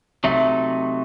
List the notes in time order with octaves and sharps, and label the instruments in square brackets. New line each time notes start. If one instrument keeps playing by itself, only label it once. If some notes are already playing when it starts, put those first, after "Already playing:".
[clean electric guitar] C3 F#3 A3 D#4 [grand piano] E5